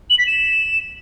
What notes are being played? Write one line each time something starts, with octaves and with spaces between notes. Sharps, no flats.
F#7
B6
E7